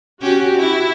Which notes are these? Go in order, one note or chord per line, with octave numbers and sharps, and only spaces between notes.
C#4 F#4 G4
E4